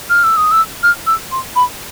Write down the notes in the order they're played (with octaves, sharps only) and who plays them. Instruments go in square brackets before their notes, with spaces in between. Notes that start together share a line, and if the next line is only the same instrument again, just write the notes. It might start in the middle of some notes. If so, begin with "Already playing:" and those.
[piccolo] F6
E6
D#6
E6
F6
E6
C6
B5